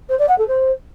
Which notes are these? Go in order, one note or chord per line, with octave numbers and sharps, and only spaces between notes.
C5
D5
F#5
A4
C5